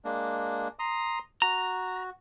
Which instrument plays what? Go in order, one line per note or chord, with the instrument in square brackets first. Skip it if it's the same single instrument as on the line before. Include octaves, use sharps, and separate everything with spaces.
[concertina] G#3 A#3 D4
A#5 C6 D#6
[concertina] F#4 [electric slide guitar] A#5